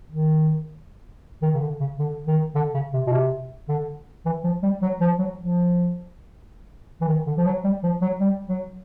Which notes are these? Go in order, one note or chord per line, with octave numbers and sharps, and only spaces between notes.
D#3
D#3
C#3
D3
C#3
D3
D#3
D3
C#3
C3
B2
C3
D3
E3
F3
G3
F#3
F3
F#3
F3
E3
D#3
D3
F3
F#3
G3
F3
F#3
G3
F#3